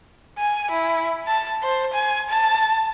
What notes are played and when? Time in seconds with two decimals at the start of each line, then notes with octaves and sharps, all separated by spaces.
0.38 G#5
0.71 E4
1.27 A5
1.63 C5
1.93 G#5
2.29 A5